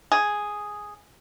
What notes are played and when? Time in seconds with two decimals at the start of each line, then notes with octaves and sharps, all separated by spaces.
0.12 G#4